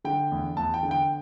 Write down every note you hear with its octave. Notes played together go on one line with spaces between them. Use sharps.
D3 G5
E2
E2 A5
G5
D3
G5